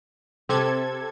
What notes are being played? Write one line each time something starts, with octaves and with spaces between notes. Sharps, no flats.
C3 C4 G4 A4 G#6